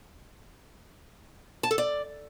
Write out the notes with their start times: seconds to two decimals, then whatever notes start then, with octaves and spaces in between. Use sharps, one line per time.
1.63 A5
1.71 A4
1.78 D5